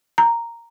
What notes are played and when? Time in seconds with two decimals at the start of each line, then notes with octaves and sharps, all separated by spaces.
0.18 A#5